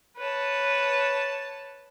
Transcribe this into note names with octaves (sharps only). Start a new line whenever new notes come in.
B4 C#5 A5